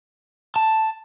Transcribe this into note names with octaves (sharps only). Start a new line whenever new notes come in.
A5